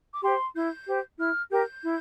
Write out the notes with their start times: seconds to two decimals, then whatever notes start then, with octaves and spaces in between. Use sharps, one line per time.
0.13 D6
0.22 G4 C5 C6
0.55 E4 G6
0.87 G4 C5
1.18 E4 F6
1.50 G4 A#4 G6
1.83 E4